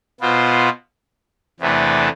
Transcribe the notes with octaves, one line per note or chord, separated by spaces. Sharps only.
B2 B3 F4 C5
E2 C3 E3 A3 D4